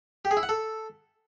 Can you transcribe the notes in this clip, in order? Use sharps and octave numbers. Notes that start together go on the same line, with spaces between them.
G4
G#4
E4
F#5
A4